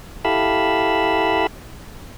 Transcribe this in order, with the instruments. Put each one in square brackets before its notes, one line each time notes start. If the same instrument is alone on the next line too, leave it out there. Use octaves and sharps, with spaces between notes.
[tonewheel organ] E4 G4 A4 F5 B5 E6